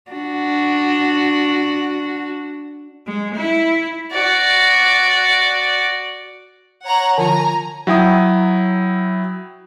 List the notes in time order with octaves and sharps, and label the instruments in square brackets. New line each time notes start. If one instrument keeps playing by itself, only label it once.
[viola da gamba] D4 F#4
[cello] G#3
E4
[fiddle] F#4 D5
[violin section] C#5 F#5 A#5
[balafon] D3 F3 F4 [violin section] G#5 A#5
[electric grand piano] F#3 E4 G5 D#6